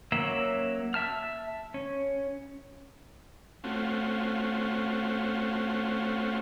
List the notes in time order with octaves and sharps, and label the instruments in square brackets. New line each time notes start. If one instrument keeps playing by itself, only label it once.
[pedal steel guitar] F#3 A#3 C#4 E5
E5 A5 F6
C#4
[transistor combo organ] A3 C4 C#4 F4 F#4